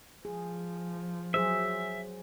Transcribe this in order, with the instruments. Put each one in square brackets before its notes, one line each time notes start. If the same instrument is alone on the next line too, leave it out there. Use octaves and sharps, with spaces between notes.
[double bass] F3 [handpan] G#4
[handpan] F#3 G#4 C5 [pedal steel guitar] E5